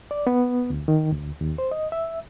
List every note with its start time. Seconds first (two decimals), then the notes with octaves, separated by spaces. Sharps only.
0.11 D5
0.27 B3
0.70 D2
0.88 D#3
1.12 D2
1.41 D#2
1.58 C5
1.71 D#5
1.92 E5